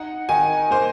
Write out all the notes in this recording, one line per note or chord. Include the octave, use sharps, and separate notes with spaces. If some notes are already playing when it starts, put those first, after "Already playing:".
Already playing: D#4 F#5
D#3 G#5
A#3 C5